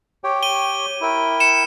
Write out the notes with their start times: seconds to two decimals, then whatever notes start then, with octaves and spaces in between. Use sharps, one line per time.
0.24 G4 C#5 G5
0.43 D#7 G7
1.01 E4 A#4 E5 G5
1.40 C#7 E7